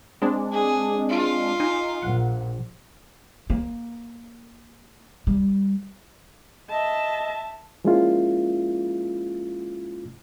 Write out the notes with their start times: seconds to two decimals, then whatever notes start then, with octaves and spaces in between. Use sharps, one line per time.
0.22 G#3 C4 D4
0.53 G#4
1.10 F4
1.60 D#4 G#5
2.02 A#1 F#5
3.50 A#3
5.27 G3
6.69 D#5 E5 A5
7.84 F3 G#3 A#3 C#4 E4 F4